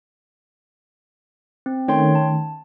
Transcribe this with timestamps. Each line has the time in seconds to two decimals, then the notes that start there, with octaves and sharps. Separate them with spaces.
1.66 C4
1.88 D#3 A3 C#4 C#5 G5 C6
2.15 A5